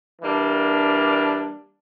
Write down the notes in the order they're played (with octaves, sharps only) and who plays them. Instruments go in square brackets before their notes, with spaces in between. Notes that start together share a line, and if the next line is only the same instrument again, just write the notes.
[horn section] E3 G3 A#3 D4